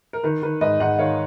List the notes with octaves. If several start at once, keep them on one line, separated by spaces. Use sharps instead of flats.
A#4
D#3 B4
D#3 B4
G#2 B4 D#5
G#2 D#5 F#5
D#3 C#5 F5